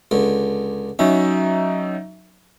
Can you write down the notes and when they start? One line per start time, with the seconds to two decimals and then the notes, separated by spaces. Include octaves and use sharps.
0.11 C#2 D3
0.99 F#3 C#4 D#4 E5